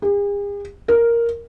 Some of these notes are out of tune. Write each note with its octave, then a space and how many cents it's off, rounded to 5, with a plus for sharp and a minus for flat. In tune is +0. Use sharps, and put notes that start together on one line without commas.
G#4 -45
A#4 +0